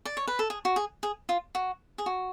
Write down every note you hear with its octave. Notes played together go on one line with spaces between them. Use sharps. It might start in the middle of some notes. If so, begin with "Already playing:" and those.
D5
C#5
B4
A4
G#4
F#4
G#4
G#4
F4
F#4
G#4
F#4